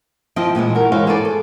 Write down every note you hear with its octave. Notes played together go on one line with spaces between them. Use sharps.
F3 C4 E4 D#5
A#2 D3 E3 G#3
F#4 A#4
E3 G#3 C5 C#5 F5
G#4 A4 B4 D5
A4